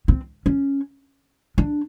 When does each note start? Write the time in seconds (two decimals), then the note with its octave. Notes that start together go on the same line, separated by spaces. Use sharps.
0.08 C4
0.46 C#4
1.58 D4